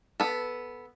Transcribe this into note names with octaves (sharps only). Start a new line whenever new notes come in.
B3 A4